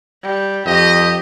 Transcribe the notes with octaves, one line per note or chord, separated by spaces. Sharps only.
G3
F2 G4 D#5